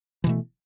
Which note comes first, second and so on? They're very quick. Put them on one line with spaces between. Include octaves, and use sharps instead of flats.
E3 B2 A3